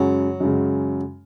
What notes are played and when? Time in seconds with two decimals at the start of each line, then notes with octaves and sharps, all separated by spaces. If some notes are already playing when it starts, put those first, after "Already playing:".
Already playing: F#2 C#3 F#3 G#3
0.40 F#2 C#3 G#3